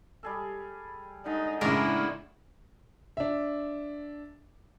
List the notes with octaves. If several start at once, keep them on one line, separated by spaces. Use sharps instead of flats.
G3 G#4 A4
D3 G#3 D#4
A2 C#3 G#3 A#3 D4 E4 A#4
D4 E5